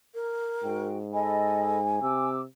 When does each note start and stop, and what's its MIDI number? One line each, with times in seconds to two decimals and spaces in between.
0.14 0.88 70
0.63 1.99 44
0.63 0.97 66
0.63 0.97 79
1.13 1.78 69
1.13 1.78 75
1.13 2.29 80
1.13 1.78 83
2.02 2.45 48
2.02 2.40 86
2.02 2.40 88